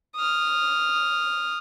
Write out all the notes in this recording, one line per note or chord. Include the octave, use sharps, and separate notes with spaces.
D#6 F6